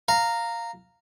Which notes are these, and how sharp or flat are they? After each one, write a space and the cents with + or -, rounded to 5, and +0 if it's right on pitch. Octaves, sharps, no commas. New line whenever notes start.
F5 +0 A#5 -10